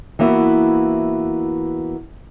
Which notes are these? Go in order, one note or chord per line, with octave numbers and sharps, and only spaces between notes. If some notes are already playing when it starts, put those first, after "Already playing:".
E3 A#3 B3 E4 F#4